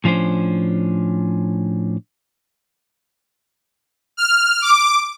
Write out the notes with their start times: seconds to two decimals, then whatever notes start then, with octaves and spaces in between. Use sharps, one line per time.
0.04 A2 F3 C#4 D4 C5
4.17 F6
4.62 D6